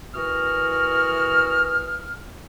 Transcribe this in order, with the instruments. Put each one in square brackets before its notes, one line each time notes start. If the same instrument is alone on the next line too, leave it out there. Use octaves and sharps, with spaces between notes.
[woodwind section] E3 F#4 A#4 D#6 F6